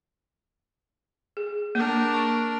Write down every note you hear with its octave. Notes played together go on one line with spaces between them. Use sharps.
G#4
A#3 D4 A#4
C#6